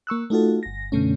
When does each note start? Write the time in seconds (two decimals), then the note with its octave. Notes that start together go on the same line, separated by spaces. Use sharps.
0.07 A#3 C#6 E6 F#6
0.30 A3 D#4 F4 F#4 A4
0.63 G1 A#6
0.92 F#2 B2 D3 A3 C#4